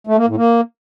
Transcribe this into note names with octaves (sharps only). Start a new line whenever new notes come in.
A3
A#3
A2
A#3